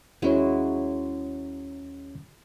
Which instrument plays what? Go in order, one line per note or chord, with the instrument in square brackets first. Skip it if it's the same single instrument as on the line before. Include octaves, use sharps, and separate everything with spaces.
[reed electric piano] D#2 C#4 C#5 [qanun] F#3 G#3 E4